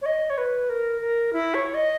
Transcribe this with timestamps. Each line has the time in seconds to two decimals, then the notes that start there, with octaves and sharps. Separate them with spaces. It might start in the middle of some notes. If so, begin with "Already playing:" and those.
0.02 C#5
0.06 D#5
0.30 C#5
0.38 B4
0.69 A#4
1.01 A#4
1.33 E4
1.54 C#5
1.74 D#5